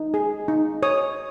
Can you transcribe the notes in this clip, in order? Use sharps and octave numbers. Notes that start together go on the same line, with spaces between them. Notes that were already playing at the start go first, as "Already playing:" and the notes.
Already playing: D#4
G#4
D#4
C#5 D#6